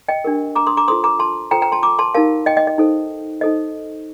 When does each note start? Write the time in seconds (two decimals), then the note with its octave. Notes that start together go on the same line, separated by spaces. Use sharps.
0.08 D#5 G5
0.25 D4 G4 A#4
0.56 A#5 D6
0.67 C6 D#6
0.77 A#5 D6
0.88 F4 A4 C5 C6 D#6
1.04 A#5 D6
1.19 A5 C6
1.51 F4 A4 C5 G5 A#5
1.62 G5 A#5
1.72 A5 C6
1.83 A#5 D6
1.99 A5 C6
2.14 D#4 G4 A#4 F5 A5
2.46 D#5 G5
2.57 D#5 G5
2.67 D#5
2.78 D#4 A4 C5
3.41 D#4 A4 C5 D#5